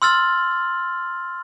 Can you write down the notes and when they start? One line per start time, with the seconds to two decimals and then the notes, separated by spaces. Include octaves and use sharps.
0.02 C6 E6 F6 A6 F#7